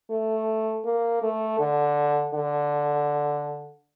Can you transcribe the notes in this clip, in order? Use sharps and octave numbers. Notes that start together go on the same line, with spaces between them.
A3
A#3
A3
D3
D3